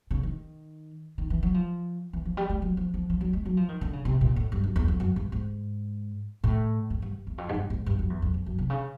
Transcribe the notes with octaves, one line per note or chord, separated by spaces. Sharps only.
C#3
D#3
D#3
E3
F#3
F3
E3
F3
G3
G#3
F#3
F3
F3
F3
F#3
G#3
F#3
F3
D#3
D3
C#3
C3
A#2
A2
G2
F#2
E2
F2
F#2
G2
G#2
A2
G#2
G2
E2
F2
G#2
G2
G#2
G2
F#2
E2
F2
F2
F#2
C3
C#3